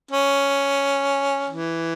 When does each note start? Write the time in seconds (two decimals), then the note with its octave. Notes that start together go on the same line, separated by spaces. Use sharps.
0.11 C#4
1.50 E3